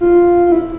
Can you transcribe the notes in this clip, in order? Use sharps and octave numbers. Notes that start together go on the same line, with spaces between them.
F4
F4
E4